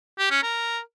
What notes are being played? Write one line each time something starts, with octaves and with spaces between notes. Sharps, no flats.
G4
C#4
A#4